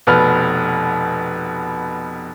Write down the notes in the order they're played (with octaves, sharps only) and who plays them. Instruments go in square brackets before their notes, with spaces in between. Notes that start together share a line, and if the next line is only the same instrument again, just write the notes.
[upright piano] F1 B2 B4 F6